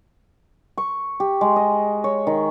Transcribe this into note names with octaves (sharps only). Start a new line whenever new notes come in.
C#6
G4
G#3
D#5
C#5
D#3